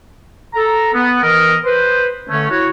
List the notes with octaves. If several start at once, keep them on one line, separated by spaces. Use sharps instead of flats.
A4 A#5
B3
E3 A#4 D#5
B4 C5
D3 A3 C#4
E4 F#4 C#5